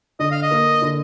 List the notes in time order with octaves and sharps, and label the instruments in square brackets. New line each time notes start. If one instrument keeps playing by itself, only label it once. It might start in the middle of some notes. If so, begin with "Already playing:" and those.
[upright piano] D3 [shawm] D#5
[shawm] F5
D#5
[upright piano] A#3
D3